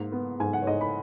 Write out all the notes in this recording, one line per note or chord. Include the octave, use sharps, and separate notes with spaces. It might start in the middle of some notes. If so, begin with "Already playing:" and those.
Already playing: G#2 A#3
B3
G#2 G#5
F#5
C#5
G#2 D#5
B5